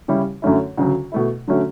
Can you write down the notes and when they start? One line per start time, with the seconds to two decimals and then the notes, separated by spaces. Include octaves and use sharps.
0.08 C#3 G3 C#4 E4
0.42 F#2 D3 A3 C#4 E4
0.77 D2 C#3 F#3
1.12 B2 A3 E4
1.48 D3 F#3 A3 C#4